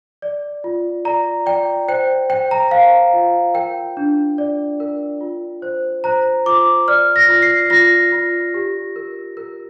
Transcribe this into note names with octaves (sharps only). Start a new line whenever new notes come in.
D5
F4
D5 A#5
D5 G5
C5 G5
C5 G5
A#5
C5 F5
F4
A#4 G5
D4
D5
A#4
F4
C5
C5 A#5
F4 D6
D5 F6
A#6
F4
C7
F4 A#6
F4
G4
A#4
A#4